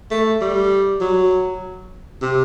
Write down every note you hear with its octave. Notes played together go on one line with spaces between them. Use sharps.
A3
G3
F#3
C3